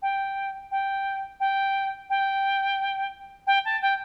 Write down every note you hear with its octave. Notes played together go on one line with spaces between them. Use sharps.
G5
G5
G5
G5
G5
A5
G5